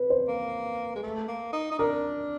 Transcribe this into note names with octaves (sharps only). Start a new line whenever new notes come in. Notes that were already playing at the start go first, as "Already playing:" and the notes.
Already playing: B4
C5
A#3
G#3
A3
A#3
D#4
D#4
D4 A#4